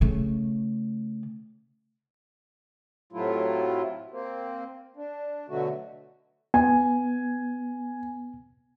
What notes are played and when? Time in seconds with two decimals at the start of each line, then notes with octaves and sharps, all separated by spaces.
0.01 C#3 A3
3.13 A2 C3 F#3 A3 E4 F4
4.11 A#3 C4
4.96 D4
5.49 B2 D3 F#3 A3 F#4
6.54 B3 G#5